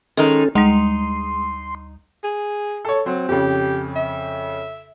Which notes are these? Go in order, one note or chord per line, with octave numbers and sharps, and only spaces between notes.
D#3 G#3 C#4 D#4 G#4 A4
D2 G3 G#3 D#4 C6
G#4
A4 C#5
F#3 C4
F2 C#3 G4
E5